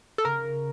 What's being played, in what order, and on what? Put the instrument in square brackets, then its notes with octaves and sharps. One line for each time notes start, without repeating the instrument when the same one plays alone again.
[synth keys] A4
[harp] C#3 [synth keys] A#4